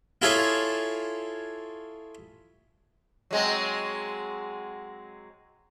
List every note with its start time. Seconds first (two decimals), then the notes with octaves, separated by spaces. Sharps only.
0.22 E4 F4 G#4 A4 C#5
3.31 F#3 G#3 C4